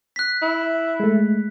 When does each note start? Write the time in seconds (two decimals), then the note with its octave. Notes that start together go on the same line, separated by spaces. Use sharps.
0.16 F#6 B6
0.42 E4
1.00 G#3 A3